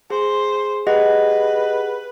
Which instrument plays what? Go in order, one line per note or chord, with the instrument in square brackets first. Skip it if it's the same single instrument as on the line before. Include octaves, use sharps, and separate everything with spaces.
[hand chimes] G#4 [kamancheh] C5
[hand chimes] G4 G#4 F#5 [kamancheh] B4 [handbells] D#5